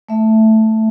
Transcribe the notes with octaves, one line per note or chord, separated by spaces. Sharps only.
A3 E5